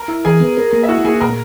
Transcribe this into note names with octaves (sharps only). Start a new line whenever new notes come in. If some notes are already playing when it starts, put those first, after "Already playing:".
Already playing: A#4 A#5
E4
E3 G#4 G#5
B3
A#4
A#3
E5
E4 F#4 F#5
A#3 G#4 G#5
A#2 A#4 A#5